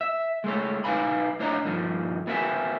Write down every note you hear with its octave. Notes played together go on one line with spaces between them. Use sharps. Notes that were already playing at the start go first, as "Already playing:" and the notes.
E5
G#3 A3 C#5
B1 D#4 B4 F5 G#5 B5
A2 D4 C#5 D#5 F5 A#5
G2 D#3 F3
B3 F#4 A#4 E5 F#5 G#5